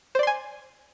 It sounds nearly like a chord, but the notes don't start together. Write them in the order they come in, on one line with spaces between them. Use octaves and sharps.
C5 D5 C6 G#5